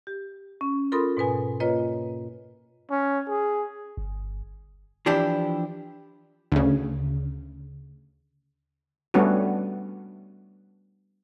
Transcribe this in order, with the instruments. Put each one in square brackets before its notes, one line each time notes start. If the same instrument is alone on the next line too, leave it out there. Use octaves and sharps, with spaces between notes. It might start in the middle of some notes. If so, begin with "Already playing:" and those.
[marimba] G4
C#4
F4 A4 A#4 B5 C6 D#6
G#2 B2 B4 G#5
A#3 F4 B4 C#5 D#5
[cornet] C#4
G#4
[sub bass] G1
[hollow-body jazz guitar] E3 F3 D4 E4 G4
[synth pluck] D2 C#3
[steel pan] G3 A3 B3 C#4 D4 F#4